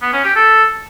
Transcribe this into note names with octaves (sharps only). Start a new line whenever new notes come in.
B3
C#4
G4
A4